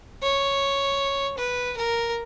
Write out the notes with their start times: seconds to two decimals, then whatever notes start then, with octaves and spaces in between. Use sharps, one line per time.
0.23 C#5
1.38 B4
1.77 A#4